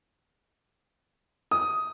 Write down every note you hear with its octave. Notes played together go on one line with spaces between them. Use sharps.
D#6